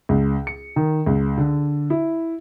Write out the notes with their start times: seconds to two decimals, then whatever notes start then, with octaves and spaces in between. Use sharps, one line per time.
0.09 C#2
0.47 C#7
0.76 D#3
1.06 C#2
1.38 D3
1.90 E4